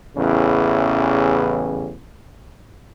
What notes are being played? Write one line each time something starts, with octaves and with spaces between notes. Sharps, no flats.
A1 E2 C#3 E3